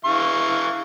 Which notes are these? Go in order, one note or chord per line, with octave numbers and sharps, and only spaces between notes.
E3 F5 C#6